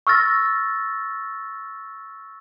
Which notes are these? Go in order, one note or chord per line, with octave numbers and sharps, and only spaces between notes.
C#6 E6 F6 A6 A#6